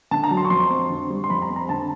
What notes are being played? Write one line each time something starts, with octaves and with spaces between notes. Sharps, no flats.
D3 A5
A#5
F#3
C6
C#6
F2 C6
C4
D3
G3
C6
F2 B5
A#5
C4
A#5
D3 A5